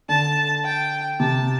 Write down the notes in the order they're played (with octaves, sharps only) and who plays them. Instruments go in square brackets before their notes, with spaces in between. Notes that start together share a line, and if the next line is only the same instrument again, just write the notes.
[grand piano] D3 [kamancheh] A5
[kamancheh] G5
[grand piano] C3 [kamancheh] A5